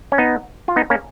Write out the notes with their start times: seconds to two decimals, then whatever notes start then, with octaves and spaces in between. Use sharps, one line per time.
0.12 C#4
0.18 B3 D#4
0.68 F4
0.76 B3 D#4
0.90 A#3 C#4